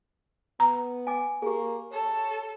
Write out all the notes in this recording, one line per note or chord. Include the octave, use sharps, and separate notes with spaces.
B3 A#5
G#5 D6
A#3 G4 G#4
A4 C#5